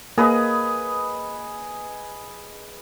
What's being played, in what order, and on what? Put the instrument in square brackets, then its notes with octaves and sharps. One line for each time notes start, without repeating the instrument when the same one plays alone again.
[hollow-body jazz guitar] A#3 [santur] G#4 B4 D#5